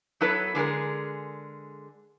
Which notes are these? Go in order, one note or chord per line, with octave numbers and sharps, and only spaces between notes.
F#3 B3 E4 A4 B4 C#5
D3 G#3 G#4 A#4